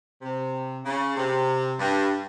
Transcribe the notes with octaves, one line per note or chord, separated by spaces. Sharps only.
C3
C#3
C3
G2